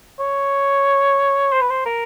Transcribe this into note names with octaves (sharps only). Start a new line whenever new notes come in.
C#5
C5
B4
C5
A#4